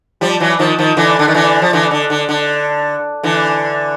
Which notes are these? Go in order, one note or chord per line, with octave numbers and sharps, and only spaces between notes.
F3 G3
E3 F#3
D#3 F3
D#3 F3
D3 E3
D3
D#3
D3 E3
F3
D3 E3
D3
D3
D3
D3 E3